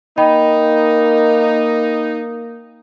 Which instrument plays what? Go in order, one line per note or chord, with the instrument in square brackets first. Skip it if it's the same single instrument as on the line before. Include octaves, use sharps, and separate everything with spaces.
[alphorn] A#3 [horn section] D#4 [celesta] D#5 G5 B5